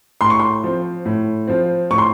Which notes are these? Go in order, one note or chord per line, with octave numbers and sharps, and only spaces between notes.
A2 C6
C#6
C6
F3 C4
A2
F3 C4
A2 C#6
C6